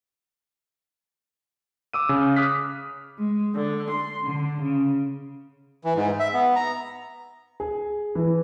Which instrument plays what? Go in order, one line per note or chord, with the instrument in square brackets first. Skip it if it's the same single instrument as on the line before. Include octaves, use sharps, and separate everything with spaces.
[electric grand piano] D6 E6 D#7
C#3
D6 D#6 F6 F#6 B6
[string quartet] G#3
D3
C6
D3
C#3
[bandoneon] E3
G#2
E5
B3
A#5
[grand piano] G#4
E3